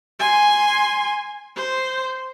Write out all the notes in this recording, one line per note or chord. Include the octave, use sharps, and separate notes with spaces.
G#5 C6
C5